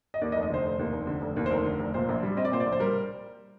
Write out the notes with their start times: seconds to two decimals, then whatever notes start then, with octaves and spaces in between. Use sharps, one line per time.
0.14 D#5
0.21 D#2 D5
0.32 D#5
0.36 F1
0.43 D#5
0.50 D3 C5
0.65 F1
0.79 D#2
0.93 F1
1.07 D3
1.22 F1
1.36 D#2
1.46 C5
1.51 F1 A#4
1.65 D3
1.79 F1
1.94 A#2 C5
2.09 A#1
2.23 G3
2.37 C4 D#5
2.45 D5
2.51 A#2 C5
2.60 D5
2.66 A#1
2.72 C5
2.80 G3 A#4